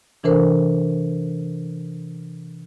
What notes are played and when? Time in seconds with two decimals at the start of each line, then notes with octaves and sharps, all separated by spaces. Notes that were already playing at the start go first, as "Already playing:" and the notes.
0.24 C3 E3 D4 A4 A#4 C5